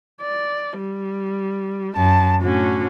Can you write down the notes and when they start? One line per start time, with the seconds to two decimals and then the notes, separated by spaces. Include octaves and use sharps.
0.22 D5
0.78 G3
1.96 F#2 A5
2.42 A2 D3 C#4 F#4